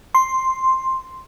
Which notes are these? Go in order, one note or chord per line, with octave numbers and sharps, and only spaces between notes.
C6